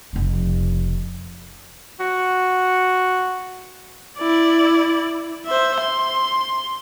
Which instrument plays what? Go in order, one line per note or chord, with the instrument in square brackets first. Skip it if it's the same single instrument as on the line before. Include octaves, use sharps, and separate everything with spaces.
[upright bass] F1 C#3
[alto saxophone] F#4
[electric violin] E4 D5
C5 E5
C6